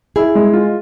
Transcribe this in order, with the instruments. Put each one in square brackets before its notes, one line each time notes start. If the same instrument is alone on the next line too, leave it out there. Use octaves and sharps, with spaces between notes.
[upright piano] E4 [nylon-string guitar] G#4
[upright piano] G#3
F4